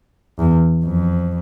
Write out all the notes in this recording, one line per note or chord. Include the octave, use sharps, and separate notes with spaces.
E2
F2